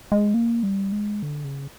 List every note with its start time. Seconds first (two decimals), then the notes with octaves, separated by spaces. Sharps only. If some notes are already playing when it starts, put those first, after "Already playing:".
0.12 G#3
0.34 A#3
0.63 G3
0.92 G#3
1.22 D3
1.44 C#3